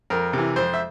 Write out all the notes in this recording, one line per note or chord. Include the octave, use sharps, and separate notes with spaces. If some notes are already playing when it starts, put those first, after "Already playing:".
F2 A#4
C3 E3
F2 C5
E5